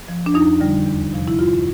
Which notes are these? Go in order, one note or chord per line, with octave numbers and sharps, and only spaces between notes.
F3
D4
F2 D#4
D3 G3
E2
C3 F3
E4
G2 F4